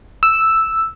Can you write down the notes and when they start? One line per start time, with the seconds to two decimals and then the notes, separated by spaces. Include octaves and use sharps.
0.23 E6